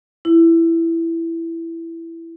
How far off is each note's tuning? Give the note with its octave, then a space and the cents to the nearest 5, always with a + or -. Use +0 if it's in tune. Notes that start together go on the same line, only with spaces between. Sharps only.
E4 +10